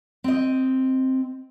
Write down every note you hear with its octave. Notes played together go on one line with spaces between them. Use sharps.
C4 D#5